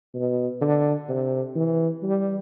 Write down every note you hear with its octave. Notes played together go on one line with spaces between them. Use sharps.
B2
D3
C3
E3
G3